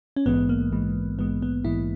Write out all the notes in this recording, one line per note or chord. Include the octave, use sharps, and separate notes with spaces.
C#4
A#1 G#2 E3 G#3 B3
A#3
A#1 G#2 E3 G#3
A#1 G#2 E3 G#3 B3
B3
A#1 G#2 E3 G#3 E4